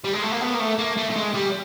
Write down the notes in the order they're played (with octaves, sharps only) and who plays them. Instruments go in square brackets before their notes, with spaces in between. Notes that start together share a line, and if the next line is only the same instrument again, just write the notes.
[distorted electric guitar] G3
G#3
A3
A#3
B3
A#3
A3
A#3
A3
A3
G#3
G3